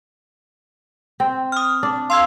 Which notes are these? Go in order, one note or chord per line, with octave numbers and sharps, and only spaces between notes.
C4
D#6 F6
D4
F5 C6 E6 G#6